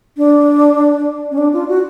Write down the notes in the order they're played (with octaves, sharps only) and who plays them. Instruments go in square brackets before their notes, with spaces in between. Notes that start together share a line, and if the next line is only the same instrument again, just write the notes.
[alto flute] D4
C#4
D4
F4
F#4